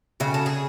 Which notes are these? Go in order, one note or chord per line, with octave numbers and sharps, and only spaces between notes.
C#3 F#4
A4
G#4